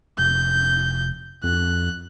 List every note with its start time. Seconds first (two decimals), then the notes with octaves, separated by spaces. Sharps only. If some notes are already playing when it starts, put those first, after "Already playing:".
0.18 F1 G6
1.44 F2 F#6